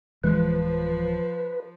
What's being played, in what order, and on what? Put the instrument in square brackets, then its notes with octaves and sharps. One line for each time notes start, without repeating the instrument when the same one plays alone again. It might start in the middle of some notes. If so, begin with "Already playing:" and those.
[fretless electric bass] D1 E3 G#3 [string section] F3 [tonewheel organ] B4